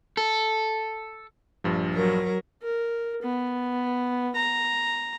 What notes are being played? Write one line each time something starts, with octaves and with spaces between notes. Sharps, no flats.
A4
A#1 G2 F3
F#3 A#4
A#4
B3
A#5